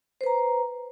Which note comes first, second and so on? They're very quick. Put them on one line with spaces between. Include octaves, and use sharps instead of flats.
C5 B4 A#5